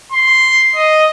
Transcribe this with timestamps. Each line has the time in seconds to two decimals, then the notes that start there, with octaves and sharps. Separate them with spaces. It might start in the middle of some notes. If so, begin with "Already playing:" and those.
0.12 C6
0.75 D#5